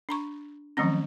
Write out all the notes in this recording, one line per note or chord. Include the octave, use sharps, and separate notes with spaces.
D4 A#5 C#6
D#3 F3 F#3 A3 C4 C#4